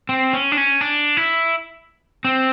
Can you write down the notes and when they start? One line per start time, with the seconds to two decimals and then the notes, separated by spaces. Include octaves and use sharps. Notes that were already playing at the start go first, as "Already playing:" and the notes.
0.09 C4
0.33 C#4
0.52 D4
0.57 C#4
0.81 D4
1.17 E4
2.24 C4